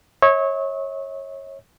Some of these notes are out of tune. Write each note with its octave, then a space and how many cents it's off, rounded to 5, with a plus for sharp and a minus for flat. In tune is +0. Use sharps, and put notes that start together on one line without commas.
C#5 -20 E5 -45